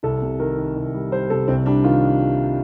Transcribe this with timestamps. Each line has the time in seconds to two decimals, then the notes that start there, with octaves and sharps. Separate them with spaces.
0.03 C2 A4
0.22 C3
0.39 D#3 A#4
0.57 D#3
0.76 C2
0.94 G3
1.12 G3 C5
1.30 C3 A4
1.48 C2 C4
1.66 G3 D4
1.84 D#3 F4